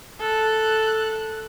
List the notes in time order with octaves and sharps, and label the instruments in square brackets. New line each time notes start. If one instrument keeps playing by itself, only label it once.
[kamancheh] A4 F#6